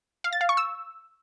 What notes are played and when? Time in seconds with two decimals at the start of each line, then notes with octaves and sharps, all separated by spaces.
0.24 F5
0.33 A6
0.41 F5
0.49 C#6
0.57 E6